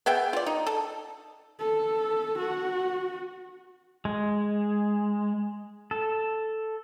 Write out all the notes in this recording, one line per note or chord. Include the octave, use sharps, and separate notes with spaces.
B3 G#4 E5 G5
F4 D5
D#4
A4
A4
F#4
G#3
A4